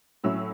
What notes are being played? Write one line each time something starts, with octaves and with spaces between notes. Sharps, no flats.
A2 F#3 C#4 E4 E6